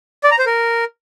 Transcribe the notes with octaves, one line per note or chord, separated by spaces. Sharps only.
D5
A#5
C5
A#4